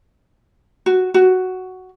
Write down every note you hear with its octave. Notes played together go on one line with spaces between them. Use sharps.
F#4
F#4